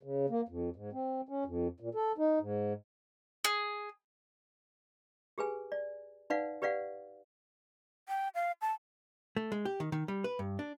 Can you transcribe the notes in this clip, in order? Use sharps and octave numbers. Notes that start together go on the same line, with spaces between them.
C#3
A#3
F2
G#2
C4
C#4
F2
A#2
A4
D#4
G#2
G#4
G4 G#4 B4 G#5
D5
D#4 B4 D5 F5 F#5
G4 B4 D5 F5 F#5
G5
F5
A5
A3
G#3
G4
D#3
D#3
G3
B4
G2
D4